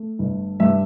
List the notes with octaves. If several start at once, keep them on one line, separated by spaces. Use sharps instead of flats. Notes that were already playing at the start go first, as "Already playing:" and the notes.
Already playing: A3
G1
G2 E5